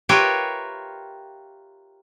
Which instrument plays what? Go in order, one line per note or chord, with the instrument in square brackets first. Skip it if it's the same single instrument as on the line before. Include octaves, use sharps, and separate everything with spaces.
[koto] F4 G4 A#4 B4 C#5 E5